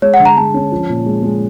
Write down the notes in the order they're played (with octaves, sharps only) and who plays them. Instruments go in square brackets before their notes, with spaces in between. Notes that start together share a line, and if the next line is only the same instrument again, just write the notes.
[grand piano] G#3 [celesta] C#5
[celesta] F#5
[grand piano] D3
[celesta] A#5
[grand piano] G#3 [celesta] A5
[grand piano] C#4
F3
A#2
G#3
G#3